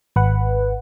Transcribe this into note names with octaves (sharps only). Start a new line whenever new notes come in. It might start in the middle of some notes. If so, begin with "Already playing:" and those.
G#1 B4 F#5